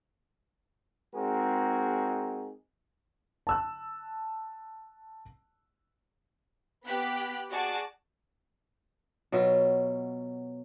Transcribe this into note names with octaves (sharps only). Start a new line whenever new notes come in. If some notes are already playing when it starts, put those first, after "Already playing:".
G#3 C4 D#4 F#4 G#4 A#4
A5 E6 F#6
B3 G4 F#6 B6
F#4 G#4 D5 A5
B2 F#3 F4 E5